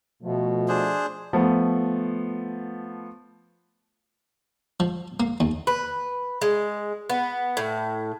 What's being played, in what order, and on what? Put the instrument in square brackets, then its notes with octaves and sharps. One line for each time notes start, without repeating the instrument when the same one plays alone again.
[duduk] B2 [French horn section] F3 A3
[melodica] D4 G#4 C5
[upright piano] F3 A3 B3
[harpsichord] F3
A#3
D#2
[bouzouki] B4
G#3
B3
A2